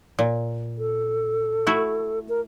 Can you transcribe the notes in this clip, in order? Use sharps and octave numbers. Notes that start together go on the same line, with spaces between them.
A#2
A4
A3 E4 F#4
A#4